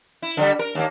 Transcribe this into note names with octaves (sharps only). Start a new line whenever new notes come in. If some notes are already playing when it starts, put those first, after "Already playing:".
E4
D3 F#3 G3
A#4
D#2 A#3